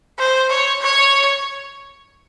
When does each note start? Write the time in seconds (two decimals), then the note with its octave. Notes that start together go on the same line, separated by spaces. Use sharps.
0.19 C5
0.50 C#5
0.81 C#5